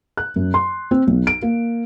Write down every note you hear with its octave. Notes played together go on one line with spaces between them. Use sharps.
F#6
F#2
C6
C4
B1
D7
A#3